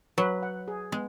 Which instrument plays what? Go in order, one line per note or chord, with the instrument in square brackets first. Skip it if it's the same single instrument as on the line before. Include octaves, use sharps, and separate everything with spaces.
[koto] F#3 [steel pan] B4
[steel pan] F#5
G#4
[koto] G#3 [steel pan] B3